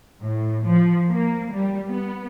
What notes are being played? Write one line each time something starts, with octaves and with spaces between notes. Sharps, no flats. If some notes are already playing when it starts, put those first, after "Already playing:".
A2
F3
A#3
G3
B3